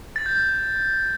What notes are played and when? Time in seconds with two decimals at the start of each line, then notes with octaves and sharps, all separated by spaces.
0.16 A6
0.26 G6